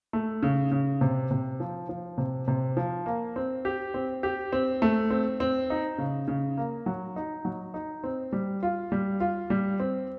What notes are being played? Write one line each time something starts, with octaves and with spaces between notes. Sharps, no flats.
A3
C#3
C#3
C3
C3
F3
F3
C3
C3
F3
A#3
C4
G4
C4
G4
C4
A3
C4
C4
D#4
C#3
C#3
A#3
F#3
D#4
F#3
D#4
C4
G3
F4
G3
F4
G3
C4